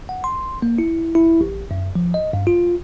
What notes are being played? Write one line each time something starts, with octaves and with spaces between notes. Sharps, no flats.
F#5
C6
A#3
E4
E4
A1
F#2
F3
D#5
G2
F4